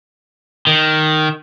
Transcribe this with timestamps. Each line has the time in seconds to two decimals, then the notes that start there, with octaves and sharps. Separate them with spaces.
0.67 D#3